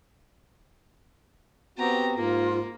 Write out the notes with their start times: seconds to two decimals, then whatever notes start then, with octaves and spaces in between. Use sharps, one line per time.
1.78 B3 C4 F#4 G4 A#5
2.16 G#2 A#3 F4